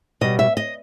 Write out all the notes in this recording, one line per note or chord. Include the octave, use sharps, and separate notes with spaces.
B2 G3 D#5
E5
D#5